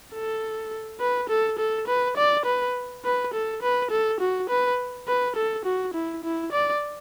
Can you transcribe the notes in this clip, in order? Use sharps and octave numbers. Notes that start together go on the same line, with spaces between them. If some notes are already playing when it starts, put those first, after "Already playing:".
A4
B4
A4
A4
B4
D5
B4
B4
A4
B4
A4
F#4
B4
B4
A4
F#4
E4
E4
D5